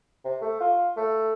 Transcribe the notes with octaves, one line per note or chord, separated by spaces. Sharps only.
C3
A3
F4
A3